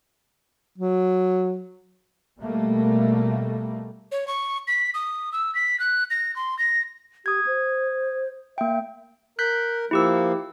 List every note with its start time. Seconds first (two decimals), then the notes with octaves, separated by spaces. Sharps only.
0.78 F#3
2.39 B2 G3 A3 A#3
4.12 C#5
4.28 C#6
4.68 B6
4.94 D#6
5.32 E6
5.55 B6
5.80 F#6
6.10 A#6
6.36 C6
6.59 A#6
7.26 G4 D#6 G#6
7.47 C5
8.58 A#3 E5 G5
9.39 A#4 F#6 G6 B6
9.91 F3 A#3 E4 G4 E6